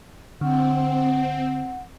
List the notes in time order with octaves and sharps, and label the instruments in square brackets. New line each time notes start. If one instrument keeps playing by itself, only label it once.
[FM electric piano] D3 [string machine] C4 [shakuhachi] F#5